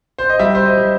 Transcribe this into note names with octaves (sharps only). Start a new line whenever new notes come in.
C5
D#5
G3 E5
C5
D#5
G3